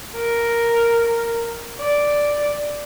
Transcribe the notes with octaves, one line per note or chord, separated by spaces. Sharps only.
A#4
D5